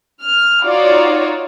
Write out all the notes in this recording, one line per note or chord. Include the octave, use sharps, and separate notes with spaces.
F6
D#4 F4 F#4 C#5 D5